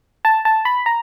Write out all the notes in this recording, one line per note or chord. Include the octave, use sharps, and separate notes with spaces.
A5
A5
B5
A#5